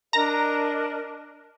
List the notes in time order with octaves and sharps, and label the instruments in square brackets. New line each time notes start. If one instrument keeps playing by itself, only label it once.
[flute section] D4 A#4 D#5 [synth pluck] A#5